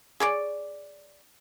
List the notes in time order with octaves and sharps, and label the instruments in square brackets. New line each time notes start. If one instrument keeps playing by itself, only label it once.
[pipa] G#4 C#5 D5